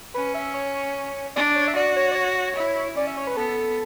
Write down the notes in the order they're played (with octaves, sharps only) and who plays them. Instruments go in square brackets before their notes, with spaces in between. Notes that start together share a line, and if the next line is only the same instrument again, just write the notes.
[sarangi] C#4 [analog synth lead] B4
[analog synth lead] E5
C#5
[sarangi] D4 [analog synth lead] D5
[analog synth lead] C#5
E5
[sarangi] F#4 [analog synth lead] D5
[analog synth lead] C#5
D5
C#5
[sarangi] E4
[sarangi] C#4 [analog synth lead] D5
[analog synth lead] E5
C#5
B4
[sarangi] B3 [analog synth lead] A4